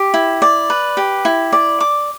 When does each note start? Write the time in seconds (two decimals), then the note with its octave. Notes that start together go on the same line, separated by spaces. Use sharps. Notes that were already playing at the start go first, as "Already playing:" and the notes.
Already playing: G4
0.14 E4
0.42 D5
0.70 B4
0.97 G4
1.25 E4
1.52 D5
1.80 D6